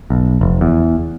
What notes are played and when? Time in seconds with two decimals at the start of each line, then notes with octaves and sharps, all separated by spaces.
0.10 B1
0.41 F1
0.61 E2